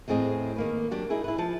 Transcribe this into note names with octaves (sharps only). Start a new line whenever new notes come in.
E2 A2 C4 G#4 D#5
D#3 A#3 B4
F#3 D4 G4
D#4 E4 G#4
E4 B4
F3 A5